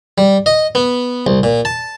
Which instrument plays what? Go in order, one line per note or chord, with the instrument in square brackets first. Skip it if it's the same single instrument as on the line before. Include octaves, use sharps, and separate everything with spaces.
[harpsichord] G3
D#5
B3
C2
A#2
A5